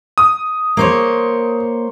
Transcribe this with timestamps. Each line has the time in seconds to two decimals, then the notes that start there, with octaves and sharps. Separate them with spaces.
0.18 D#6
0.77 A#3 C5 C#5